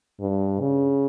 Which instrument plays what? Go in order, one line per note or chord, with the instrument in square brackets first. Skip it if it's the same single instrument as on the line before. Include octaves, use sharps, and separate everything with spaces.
[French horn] G2
C#3